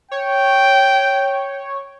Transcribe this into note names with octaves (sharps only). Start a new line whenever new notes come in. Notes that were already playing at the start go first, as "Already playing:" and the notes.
C#5 G5